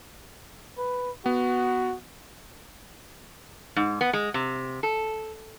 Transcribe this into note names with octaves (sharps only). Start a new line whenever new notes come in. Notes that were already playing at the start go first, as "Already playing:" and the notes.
B4
B3 F#4
G#2
B3
G#3
C3
A4